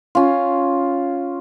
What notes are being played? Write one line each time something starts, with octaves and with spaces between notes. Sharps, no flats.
C#4 F4